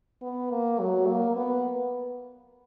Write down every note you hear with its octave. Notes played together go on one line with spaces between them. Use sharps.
B3
A#3
F#3
A#3
B3